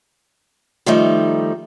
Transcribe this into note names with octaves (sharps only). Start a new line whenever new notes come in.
D#3 F3 G3 A3 D#4